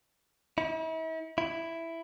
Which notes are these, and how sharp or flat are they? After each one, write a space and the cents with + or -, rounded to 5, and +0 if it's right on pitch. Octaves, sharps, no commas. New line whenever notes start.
E4 -40
E4 +5